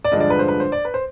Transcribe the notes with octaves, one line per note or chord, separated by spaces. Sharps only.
D5
G2 D3 F3 G#3 D4 D#5
D5
B4
C5
B4
C5
D5
B4
C5